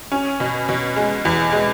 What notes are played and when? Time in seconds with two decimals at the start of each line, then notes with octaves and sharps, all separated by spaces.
0.12 C#4
0.40 B2
0.69 B2
0.96 G#3
1.25 E2
1.53 G#3